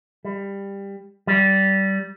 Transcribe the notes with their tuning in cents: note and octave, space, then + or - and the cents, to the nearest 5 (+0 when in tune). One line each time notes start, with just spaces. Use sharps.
G3 +15
G3 -20